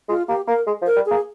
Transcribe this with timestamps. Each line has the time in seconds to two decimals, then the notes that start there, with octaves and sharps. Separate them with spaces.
0.08 G#3 F4
0.28 A#3 G4
0.47 A#3 A#4
0.67 G#3
0.81 F3
0.86 A#4
0.96 G3
1.06 A#3 G#4